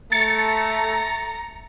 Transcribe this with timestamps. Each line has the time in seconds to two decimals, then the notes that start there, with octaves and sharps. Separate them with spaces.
0.12 A3 A#5 A6 C#7